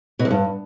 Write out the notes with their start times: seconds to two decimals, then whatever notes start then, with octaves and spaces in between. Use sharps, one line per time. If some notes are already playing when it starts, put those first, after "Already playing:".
0.19 B2
0.25 F#2
0.31 G2